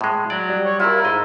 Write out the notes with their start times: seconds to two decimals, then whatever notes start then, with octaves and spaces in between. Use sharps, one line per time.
0.01 A2 G#3
0.30 F#3 D5
0.49 G3
0.65 C#5
0.79 E4 F4 A#4
1.05 G#2 D#5